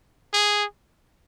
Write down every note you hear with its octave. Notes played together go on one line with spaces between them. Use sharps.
G#4